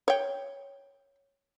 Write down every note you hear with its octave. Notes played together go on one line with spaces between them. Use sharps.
C#5 G5